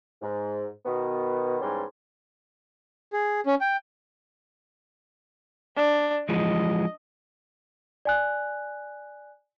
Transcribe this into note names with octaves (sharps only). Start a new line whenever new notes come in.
G#2
B2 D#3 B3
G#2 E3 G3 B3 C#4 C6
G#4
C#4
G5
D4
E3 F3 G#3 D#5
D5 G#5 F#6